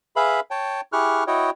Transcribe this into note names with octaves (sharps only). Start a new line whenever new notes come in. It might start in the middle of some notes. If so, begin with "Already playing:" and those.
G#4 B4 E5 F5 B5
C#5 G5 A5
E4 G4 G#4 C#6 F6 F#6
E4 F#4 C#5 D#5 G5